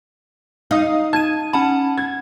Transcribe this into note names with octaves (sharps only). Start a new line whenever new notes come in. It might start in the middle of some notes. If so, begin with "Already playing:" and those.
D#4 F5 D#6
A5 G#6 D#7
C#4 F#5 A5 B5
G#6